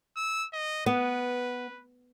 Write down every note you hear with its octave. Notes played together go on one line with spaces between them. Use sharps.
E6
D#5
B3 B4